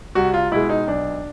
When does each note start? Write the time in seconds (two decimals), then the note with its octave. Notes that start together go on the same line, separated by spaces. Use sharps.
0.15 C2 F#4
0.34 F4
0.51 B2 G#3 E4
0.70 D#4
0.87 B1 D4